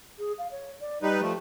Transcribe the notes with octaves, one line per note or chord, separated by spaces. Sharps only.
G#4
F5
C#5
D5
G3 D#4 G4 B4
F3 A3